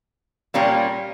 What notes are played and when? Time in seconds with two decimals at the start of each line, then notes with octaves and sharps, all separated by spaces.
0.54 A#2 G3 A#3 C#4